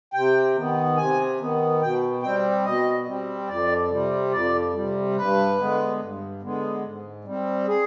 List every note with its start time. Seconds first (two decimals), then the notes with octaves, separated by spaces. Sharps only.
0.13 C3 G5
0.56 D#3 B3
0.97 C3 G#5
1.40 D#3 B3
1.81 B2 G5
2.23 G3 C4 G5
2.65 B2 D#5
3.06 G3 C4
3.48 F2 D5
3.90 C3 G3
4.32 F2 D5
4.74 C3 G3
5.16 G2 B4
5.58 D3 G#3 B3
5.99 G2
6.42 D3 G#3 B3
6.83 G#2
7.24 G3 C4
7.67 G#4